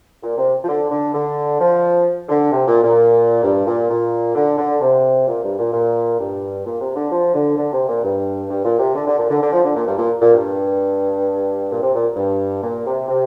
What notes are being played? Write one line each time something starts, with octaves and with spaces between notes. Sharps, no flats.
A#2
C3
F3
D3
D3
D3
F3
D3
C3
A#2
A#2
G2
A#2
A#2
D3
D3
C3
A#2
G2
A#2
A#2
G2
A#2
C3
D3
F3
D3
D3
C3
A#2
G2
G2
A#2
C3
D3
D3
A#2
D3
D3
F3
D3
A#2
G2
A#2
A#2
G2
A#2
C3
A#2
G2
A#2
C3
C3